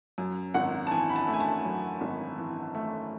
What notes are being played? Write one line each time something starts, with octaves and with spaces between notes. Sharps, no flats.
F#2
G#1 F#5
A5
E3 G#5
B5
A5
A3
G#5
A5
F#2
G#1
E3
A3